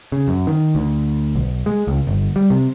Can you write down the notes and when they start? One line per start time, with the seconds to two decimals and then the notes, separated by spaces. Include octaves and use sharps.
0.12 C#3
0.28 F#2
0.47 D#3
0.75 D2
1.36 B1
1.66 G#3
1.87 C#2
2.07 G1
2.36 G3
2.50 C3